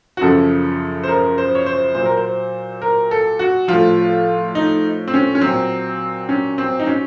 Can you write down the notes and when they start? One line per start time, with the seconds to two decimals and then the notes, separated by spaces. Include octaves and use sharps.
0.17 F#4
0.21 F#2 C#3 F3 A4
1.04 C5
1.08 A#4
1.38 C5
1.55 C#5
1.66 C5
1.95 A#2 F#3 C5
2.05 A#4
2.17 C5
2.82 A#4
3.11 A4
3.39 F#4
3.68 A2 F3 F4
4.55 D#4
5.08 C4
5.14 C#4
5.35 C#4
5.41 A#2 F#3 C4
6.29 C#4
6.58 C4
6.80 D#4
6.87 C#4